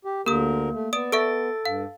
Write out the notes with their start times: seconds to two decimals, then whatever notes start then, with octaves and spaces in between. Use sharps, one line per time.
0.05 G4
0.26 D2 D3 A#3 G4 A#4 D#6
0.72 A3
0.93 B3 D5 D#6 D7
1.12 A4 E5 C#6 A6 D7
1.65 G2 F5